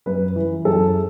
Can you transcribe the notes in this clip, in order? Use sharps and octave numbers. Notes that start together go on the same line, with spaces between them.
F#2 B4
E3
F#2 A4